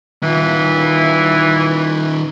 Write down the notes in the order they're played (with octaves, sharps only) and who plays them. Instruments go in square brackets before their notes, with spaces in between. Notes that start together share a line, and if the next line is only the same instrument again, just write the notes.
[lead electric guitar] D#3 F4 [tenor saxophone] E3